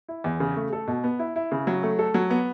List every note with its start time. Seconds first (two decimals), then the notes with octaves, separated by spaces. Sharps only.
0.08 E4
0.24 E2
0.40 C#3
0.56 A3
0.73 A4
0.87 B2
1.04 B3
1.19 E4
1.36 E4
1.52 C#3
1.67 F#3
1.83 A3
1.99 A4
2.14 F#3
2.30 B3